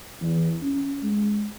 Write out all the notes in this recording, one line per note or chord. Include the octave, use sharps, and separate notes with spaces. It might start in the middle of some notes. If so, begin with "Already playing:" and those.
E2
C#4
G#3